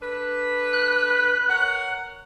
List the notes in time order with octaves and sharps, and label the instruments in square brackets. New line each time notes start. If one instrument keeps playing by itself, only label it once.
[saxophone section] D4 A4 B4
[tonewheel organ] F#6
[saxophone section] A#4 C#5 F#5